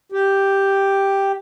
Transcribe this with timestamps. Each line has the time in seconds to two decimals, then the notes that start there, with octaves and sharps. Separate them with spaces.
0.12 G4